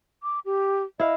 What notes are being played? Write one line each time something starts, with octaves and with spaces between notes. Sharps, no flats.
D6
G4
E4 D#5 F5